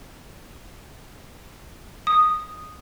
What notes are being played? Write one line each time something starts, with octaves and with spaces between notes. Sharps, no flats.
D#6